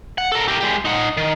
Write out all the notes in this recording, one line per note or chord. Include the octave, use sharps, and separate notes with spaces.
F#5
A4 A#4
G4 A#4
G#3 G4
D#4 F#5
D#3